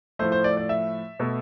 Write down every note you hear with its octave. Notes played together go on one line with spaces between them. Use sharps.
A2 F3 A3 C5
C5
D5
D5
E5
B2 A3